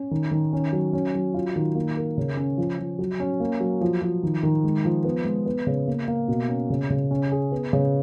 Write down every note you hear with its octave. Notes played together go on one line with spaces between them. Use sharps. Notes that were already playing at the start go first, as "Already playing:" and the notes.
Already playing: C#4
D#3
D#3
C#4
F#3
C#4
F#3
F4
D#3
A#3
A#4
C#3
C#4
F3
F3
F#3
C#4
A#3
F#3
F3
F3
D#3
D#3
G#3
F3
B3
G#3
B3
C#3
A#3
A#3
B2
C#4
C#3
C#3
C#4
G#4
B3
C#3